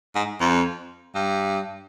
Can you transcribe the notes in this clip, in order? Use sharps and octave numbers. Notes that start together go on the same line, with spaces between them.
G#2
F2
G2